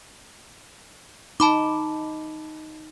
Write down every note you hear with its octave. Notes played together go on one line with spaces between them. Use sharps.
D#4 A5 B5 D6